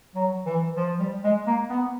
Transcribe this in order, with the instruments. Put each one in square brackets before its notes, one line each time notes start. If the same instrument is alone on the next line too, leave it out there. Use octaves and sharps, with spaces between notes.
[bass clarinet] F#3
E3
F3
G3
G#3
A#3
B3